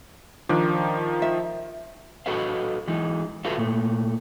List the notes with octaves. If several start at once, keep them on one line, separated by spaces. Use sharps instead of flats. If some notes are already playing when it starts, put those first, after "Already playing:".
D#3 F3 D4
E5
F#4 A4 B4 D#5 F5
E3 G#3 D#4
F4 F#4 A4 B4 E5 F5
A#2 A3